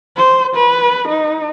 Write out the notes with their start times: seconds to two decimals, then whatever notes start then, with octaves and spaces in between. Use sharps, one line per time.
0.17 C5
0.56 B4
1.08 D#4